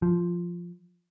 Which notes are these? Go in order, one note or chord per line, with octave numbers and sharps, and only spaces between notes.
F3